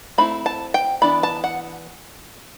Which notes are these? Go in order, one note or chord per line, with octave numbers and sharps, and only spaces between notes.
A3 C4 E4 B5
A5
G5
E3 B3 D4 B5
A5
F#5